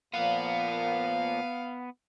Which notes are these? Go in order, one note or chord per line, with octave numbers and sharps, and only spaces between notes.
A#2 F3 A#3 B3 F5 F#5